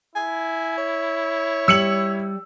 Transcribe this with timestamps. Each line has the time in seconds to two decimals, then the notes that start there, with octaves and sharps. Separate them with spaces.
0.15 E4 G#5
0.77 C#5
1.68 G3 E6 C#7 F#7